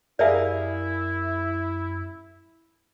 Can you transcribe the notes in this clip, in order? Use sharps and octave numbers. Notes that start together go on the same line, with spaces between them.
F#2 E4 G4 G#4 A#4 D5 E5 F5